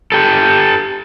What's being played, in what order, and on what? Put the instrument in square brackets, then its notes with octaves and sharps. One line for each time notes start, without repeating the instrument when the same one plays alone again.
[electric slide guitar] G4 A4